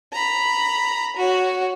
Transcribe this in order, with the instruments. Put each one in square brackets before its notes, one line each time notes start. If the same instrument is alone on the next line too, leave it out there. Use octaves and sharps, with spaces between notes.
[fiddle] A#5 B5
F#4 C#5